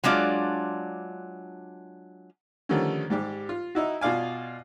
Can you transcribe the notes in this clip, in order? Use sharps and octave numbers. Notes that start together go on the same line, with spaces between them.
F#3 G#3 D4 F4 D5
D3 D#3 F3 G3 A3 C#4
G#2 G3 G4
F4
D#4 E4 F#4
B2 F4 D5 F5 G#5